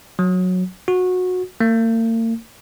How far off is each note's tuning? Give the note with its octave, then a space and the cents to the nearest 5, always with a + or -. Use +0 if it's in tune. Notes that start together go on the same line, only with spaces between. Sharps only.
F#3 -15
F#4 -20
A#3 -45